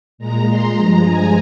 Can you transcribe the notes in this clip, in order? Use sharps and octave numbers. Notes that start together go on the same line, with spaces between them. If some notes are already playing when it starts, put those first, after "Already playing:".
A#2 G#3 A#5
C6
G2 F3 G#3 A#5
G#5